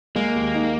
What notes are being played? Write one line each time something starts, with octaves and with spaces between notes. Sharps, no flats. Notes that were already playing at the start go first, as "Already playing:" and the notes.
G#3 A#3
D#2
D#4